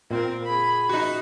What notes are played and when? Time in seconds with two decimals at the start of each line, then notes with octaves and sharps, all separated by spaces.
0.11 A#2 C4 A#4
0.44 G#4 B5
0.89 D#4 F#4